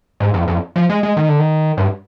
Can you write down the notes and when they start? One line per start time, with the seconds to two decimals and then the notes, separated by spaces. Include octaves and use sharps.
0.20 G#2
0.34 F2
0.47 F2
0.76 F3
0.90 G#3
1.03 G#3
1.17 D#3
1.29 D3
1.39 D#3
1.77 G2